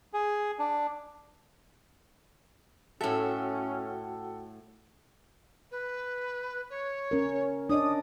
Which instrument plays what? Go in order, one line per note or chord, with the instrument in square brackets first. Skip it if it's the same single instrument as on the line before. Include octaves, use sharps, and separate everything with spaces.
[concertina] G#4
D4
[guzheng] A2 E5 [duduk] C#4 [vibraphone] F#4 F#5 G5 [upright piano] A4
[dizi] B4
C#5
[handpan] C#4 A#4
[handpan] D4 D5 D#5 [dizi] D#6